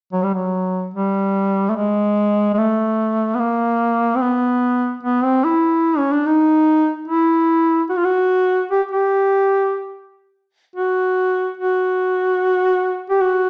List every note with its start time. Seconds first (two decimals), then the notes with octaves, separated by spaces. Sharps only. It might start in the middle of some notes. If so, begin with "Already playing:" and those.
0.13 F#3
0.23 G3
0.34 F#3
0.94 G3
1.69 A3
1.76 G#3
2.53 G#3
2.58 A3
3.34 B3
3.39 A#3
4.15 C4
4.21 B3
5.03 B3
5.24 C4
5.44 E4
5.98 C#4
6.12 D4
6.26 D#4
7.08 E4
7.90 F#4
7.97 F4
8.04 F#4
8.71 G4
8.91 G4
10.75 F#4
11.57 F#4
13.10 G4
13.21 F#4